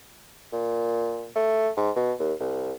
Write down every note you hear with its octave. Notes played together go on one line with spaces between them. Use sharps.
A#2
A3
G#2
B2
D#2
C2